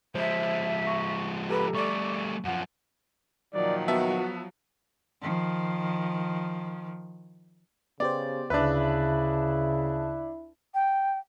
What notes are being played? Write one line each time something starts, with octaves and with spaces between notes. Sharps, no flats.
F3 G#3 C5 E5
C#6 A#6
G4 A4 B4 A#5
G3 A3 D5 C#6
F#2 F3 F#5
A#2 D#3 F3 F#3 D5
B3 F#4 E5 A5
D#3 F3
C#3 B3 G4 C5 D5
D2 C#3 D4 E4 B4 E5 A5
G5